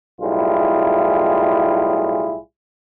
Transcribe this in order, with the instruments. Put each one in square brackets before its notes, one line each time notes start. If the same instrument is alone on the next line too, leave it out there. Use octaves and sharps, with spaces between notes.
[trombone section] B1 A2 G3 E4 F4 G#4